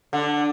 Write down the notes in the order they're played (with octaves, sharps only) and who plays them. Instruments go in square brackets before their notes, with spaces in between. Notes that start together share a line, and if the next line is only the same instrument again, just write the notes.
[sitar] D3